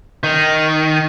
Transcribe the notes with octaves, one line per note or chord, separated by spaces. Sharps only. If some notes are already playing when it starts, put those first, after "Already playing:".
D#3